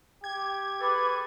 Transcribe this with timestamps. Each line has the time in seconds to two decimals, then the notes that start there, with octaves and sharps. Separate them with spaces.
0.24 G4 G#6
0.81 G#4 A4 B4 D6